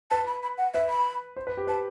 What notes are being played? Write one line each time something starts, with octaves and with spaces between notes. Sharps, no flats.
B4 A5
B5
B5
F#5
B4 E5
B5
C5
B4
G4
B4 A5